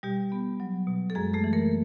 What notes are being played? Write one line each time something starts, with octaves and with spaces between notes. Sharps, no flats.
B2 G3 G4
B3
F#3
B2
A4
F#2 G#3 G#4
A3 A4
E3
A#3 A#4